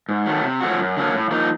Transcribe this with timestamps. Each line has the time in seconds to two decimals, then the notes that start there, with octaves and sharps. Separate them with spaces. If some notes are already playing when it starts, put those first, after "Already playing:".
0.09 G#2
0.26 D#3 F#3 A3
0.44 C3
0.61 F3 A3 C#4 F#4
0.79 F#2
0.97 D3 F#3 A#3 C#4
1.13 A2
1.31 F3 A#3 D#4